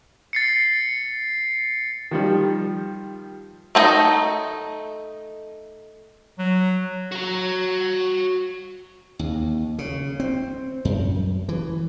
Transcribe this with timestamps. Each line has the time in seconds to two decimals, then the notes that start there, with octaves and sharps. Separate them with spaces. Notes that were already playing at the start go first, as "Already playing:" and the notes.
0.33 A6 C7 C#7
2.11 D#3 F3 G3
3.75 A3 C4 D#4 D#5 A#5
6.39 F#3
7.12 F#4 A#5
9.19 D#2
9.79 C#3
10.20 C4
10.85 F#2
11.49 E3